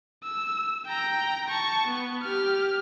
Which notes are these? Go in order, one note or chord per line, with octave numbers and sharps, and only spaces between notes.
E6
G5 A#5
A5 C#6
B3
G4 F6